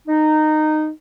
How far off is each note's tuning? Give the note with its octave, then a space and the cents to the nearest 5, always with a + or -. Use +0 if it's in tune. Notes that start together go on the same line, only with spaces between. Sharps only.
D#4 -15